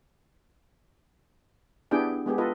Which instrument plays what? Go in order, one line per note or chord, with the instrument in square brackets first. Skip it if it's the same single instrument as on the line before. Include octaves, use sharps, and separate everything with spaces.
[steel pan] B3 D4 E4 G4 G#4 G5
G#3 B3 G4 G#4
F4 A4 B4 D#5